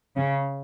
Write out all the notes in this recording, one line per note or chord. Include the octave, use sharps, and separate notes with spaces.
C#3